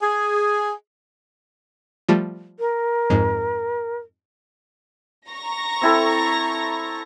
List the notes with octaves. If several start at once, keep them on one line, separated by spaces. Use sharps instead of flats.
G#4
F3 G3 A3
A#4
F2 G#2
A#5 C#6 A#6
C4 E4 A4